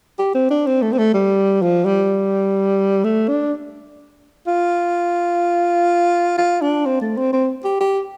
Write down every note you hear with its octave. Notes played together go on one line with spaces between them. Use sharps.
G4
C4
D4
C4
A3
C4
A3
G3
F3
G3
A3
D4
F4
F4
D4
C4
A3
C4
C4
G4
G4